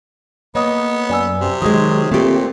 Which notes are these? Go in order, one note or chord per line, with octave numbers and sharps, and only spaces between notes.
A#3 B3 C#5 D#5 D#6
F#2 D5 G#5 E6
C3
D#3 F#3 G#3 D#6 G#6
A#2 A3 C4 G4